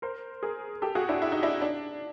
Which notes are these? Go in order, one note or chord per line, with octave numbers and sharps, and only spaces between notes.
A#4 C5
G#4 A#4
G4 A4
F#4 G#4
D4 E4
E4
D#4
D4 E4
D4